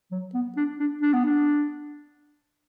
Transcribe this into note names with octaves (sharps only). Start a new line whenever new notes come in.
F#3
B3
D4
D4
D4
B3
D4